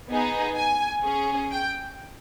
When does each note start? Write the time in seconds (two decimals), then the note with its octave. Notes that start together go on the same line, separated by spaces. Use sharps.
0.09 B3 D#4 G#4
0.56 G#5
1.03 C#4 G#4
1.50 G5